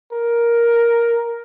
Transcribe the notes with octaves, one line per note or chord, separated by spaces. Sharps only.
A#4